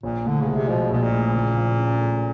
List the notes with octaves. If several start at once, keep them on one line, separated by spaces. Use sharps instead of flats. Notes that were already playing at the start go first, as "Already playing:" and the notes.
A#1 A#2
A2 D3
C#3
G#3
C3
B2 F3
A#1 B2
A#2
A2
C#3
F3
C#4
A3